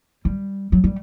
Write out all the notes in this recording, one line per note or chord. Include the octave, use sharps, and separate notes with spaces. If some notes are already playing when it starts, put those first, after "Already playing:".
G3
F#3
G3